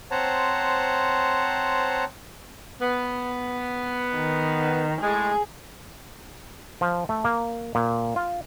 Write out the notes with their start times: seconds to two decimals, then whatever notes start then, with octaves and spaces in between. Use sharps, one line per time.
0.11 C4 C5 C#5 F#5 A5 A#5
2.80 B3
4.15 D#3
5.01 A2 G#3 G#4
6.81 F3
7.09 A3
7.25 A#3
7.75 A#2
8.16 F4